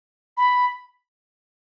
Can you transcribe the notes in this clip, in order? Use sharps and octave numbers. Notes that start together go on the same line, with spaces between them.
B5